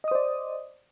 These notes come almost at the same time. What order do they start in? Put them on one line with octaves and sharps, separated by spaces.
D#5 D#6 C5 D5